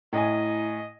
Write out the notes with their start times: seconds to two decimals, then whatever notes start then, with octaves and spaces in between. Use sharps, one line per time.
0.13 A2 E4 D#5 G#5